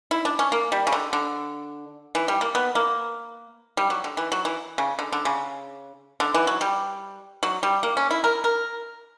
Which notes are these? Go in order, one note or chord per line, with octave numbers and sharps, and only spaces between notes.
E4
D4
C#4
A#3
G3
C#3
D3
D3
E3
G3
A#3
B3
A#3
G3
F#3
D3
E3
F#3
E3
C#3
D3
D3
C#3
D3
E3
F#3
G3
F#3
G3
A#3
C#4
E4
A#4
A#4